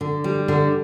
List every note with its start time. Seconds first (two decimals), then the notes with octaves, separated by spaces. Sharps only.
0.01 D3
0.24 G3
0.48 D3